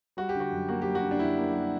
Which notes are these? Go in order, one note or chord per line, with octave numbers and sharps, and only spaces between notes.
G3 F#4
G4
D3
F#4
F#2
A#3 F#4
G3 G4
F#4
D3
D4
F#2 E4
A#3
G3